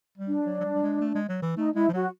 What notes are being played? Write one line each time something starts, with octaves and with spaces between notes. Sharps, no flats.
G3
D4
F#3
F#3
G3
G3
G#3
A3
G#3
F#3
E3
A3 D#4
G#3 E4
F3
F#3 F#4